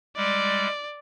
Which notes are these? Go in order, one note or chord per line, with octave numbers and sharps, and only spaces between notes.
G3 G#3 D5